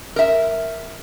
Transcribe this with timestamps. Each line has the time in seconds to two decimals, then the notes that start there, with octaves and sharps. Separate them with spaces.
0.16 A#4 E5